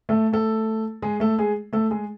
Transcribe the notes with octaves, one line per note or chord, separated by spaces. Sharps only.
A3 A4
A3 A4
G#3 G#4
A3 A4
G#3 G#4
A3 A4
G#3 G#4